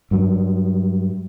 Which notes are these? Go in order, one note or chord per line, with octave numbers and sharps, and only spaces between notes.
G2 F#3